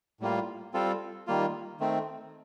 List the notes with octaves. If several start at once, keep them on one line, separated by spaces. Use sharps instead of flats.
A2 G3 A#3 F4
G3 C4 F4 A4
D#3 G3 A#3 F4
D#3 A3 C4